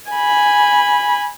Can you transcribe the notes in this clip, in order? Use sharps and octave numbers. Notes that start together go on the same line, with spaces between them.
G#5 B5